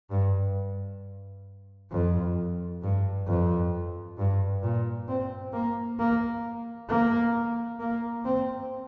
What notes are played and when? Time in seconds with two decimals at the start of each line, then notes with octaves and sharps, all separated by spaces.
0.11 G2
1.92 F2
2.83 G2
3.27 F2
4.18 G2
4.62 A#2
5.08 C4
5.53 A#3
5.99 A#3
6.89 A#3
7.80 A#3
8.25 C4